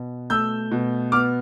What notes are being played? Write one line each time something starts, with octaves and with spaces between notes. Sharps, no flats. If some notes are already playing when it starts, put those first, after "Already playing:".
Already playing: B2
A3 E6 G6
B2
B3 D6 F6